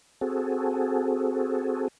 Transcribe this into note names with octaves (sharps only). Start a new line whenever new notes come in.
C4 F#4 G#4 A4